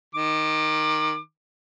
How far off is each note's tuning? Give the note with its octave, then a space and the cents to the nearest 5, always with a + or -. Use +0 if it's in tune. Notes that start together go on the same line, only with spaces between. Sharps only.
D#3 +0 D6 +25